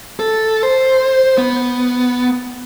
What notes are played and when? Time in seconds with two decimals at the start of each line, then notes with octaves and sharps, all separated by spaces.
0.20 A4
0.63 C5
1.38 B3